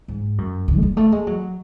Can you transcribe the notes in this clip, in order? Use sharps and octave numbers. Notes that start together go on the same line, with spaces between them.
G#2
F#2
C#3
A3
G#3
A3
G#3
F#3